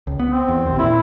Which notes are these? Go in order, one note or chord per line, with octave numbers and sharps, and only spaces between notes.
C#2
B3
C4
E2
A#1 D#2
A#2 E4